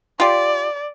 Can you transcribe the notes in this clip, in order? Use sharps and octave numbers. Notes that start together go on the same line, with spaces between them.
F4 G4 D5